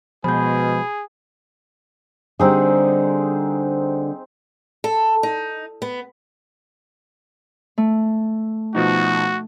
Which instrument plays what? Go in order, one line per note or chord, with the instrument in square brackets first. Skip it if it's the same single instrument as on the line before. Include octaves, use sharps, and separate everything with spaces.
[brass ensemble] B2 [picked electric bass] F3 G#3 [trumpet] G#4 [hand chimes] B5 G6
[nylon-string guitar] D3 G3 [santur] C4 D#4 G#4
[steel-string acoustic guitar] A4
D#4
B3
[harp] A3
[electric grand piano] B2 F3 D#4 [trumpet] F#4